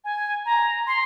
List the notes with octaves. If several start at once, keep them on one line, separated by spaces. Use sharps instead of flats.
G#5
A#5
C6